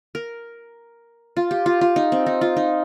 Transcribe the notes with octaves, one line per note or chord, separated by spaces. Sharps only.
A#4
F4
G4
F4
F4
D#4
C4
D#4
F4
D#4